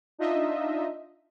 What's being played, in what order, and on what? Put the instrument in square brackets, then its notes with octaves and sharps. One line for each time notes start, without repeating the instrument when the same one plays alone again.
[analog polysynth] D4 D#4 F4 D#5 E5